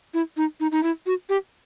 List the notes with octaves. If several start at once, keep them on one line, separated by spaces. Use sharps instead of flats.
E4
D#4
D#4
D#4
E4
F#4
G4